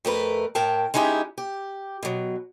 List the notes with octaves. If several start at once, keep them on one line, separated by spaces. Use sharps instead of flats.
F2 A3 A#4 B4
A2 A#4 G5 A5
G#3 C#4 D#4 E4 G4 G#4
G4
B2 F#3